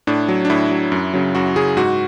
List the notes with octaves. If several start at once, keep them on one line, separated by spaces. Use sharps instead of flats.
A2 D4
F#3
D4
A2 E4
F#3
F#2
C#3 F#3
F#2 F#4
C#3 F#3 G#4
G#2 F#4